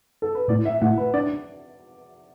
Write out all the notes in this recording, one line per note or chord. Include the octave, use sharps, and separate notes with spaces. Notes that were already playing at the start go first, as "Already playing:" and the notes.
A4
B4
A2 A3 E4 D5
E5
A2 A3 E4 F#5
B4
D4 D5